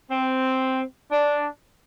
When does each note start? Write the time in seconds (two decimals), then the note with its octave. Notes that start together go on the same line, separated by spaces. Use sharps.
0.11 C4
1.11 D4